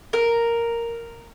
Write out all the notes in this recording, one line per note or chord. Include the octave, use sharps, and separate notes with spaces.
A#4